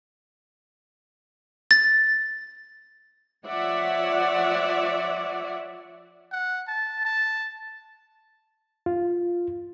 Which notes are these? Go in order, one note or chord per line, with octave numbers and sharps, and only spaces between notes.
A6
F3 C#5 D5 E5 F#5
F#5
A5
A5
F4